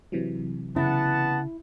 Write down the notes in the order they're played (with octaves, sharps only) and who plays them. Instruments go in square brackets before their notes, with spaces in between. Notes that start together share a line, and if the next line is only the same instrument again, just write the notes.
[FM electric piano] C3 E3 F#3
[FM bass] C#3 [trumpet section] B3 F#5 A5 [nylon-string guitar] E4